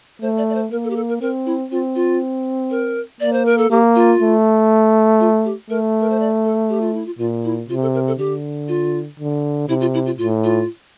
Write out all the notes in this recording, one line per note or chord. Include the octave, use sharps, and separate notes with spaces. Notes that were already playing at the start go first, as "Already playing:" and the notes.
A3 C5
D5
D5
C5
A#3 A#4
A4
G4
A4
A#4
C4 A#4
E4
C4 F4
F4
A#4
A#3 D5
C5
A#4
A4
A#3 G4
F4
A3
F4
G4
A3 A#4
A#4
C5
D5
A4
G4
F4
E4
F4
A#2 F4
E4
C3 F4
A4
A#4
A4
D3 G4
F4
D3
C3 E4
F4
E4
F4
A2 F4
F4